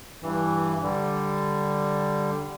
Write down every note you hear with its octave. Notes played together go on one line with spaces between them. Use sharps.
G2 E3
D3 G3